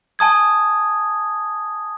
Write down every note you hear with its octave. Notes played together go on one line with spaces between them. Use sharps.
G#5 A5 D#6 G#6